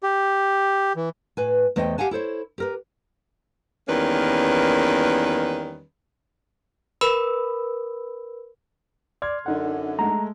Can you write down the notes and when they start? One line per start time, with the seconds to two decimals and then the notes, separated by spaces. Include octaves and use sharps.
0.03 G4
0.96 E3
1.37 A2 B4 G#5
1.76 E2 A3 C5 D#5 E5 G5
1.98 G4 F5 F#5 G#5 A5
2.11 E4 A4 C5 C#5
2.58 G4 A#4 B4
3.88 E2 D#3 G3 A#3 C#4 B4
7.01 A#4 B4 B5 E6
9.22 D5 C6 F6 G#6
9.46 F#2 D3 D4 D#4 F#5
9.99 G#3 A3 A#5